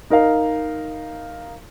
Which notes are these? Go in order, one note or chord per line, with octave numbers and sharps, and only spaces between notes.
D#4 A#4 D#5 F5